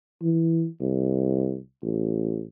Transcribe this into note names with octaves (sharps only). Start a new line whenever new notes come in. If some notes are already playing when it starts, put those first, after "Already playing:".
E3
C2
A1